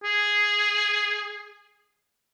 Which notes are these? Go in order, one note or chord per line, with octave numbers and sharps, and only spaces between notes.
G#4